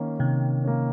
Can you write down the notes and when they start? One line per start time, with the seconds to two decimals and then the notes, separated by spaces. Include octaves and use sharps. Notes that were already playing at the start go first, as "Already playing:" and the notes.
Already playing: D#3 A#3 C#4
0.19 C3 D#3
0.64 A#3 C#4